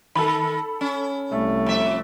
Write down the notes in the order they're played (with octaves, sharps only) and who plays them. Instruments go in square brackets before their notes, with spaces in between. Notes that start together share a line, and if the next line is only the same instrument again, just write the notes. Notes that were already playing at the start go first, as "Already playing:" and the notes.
[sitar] D#3 [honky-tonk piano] A4 B5
[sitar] C#4
[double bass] C2 A3
[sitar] F2 E5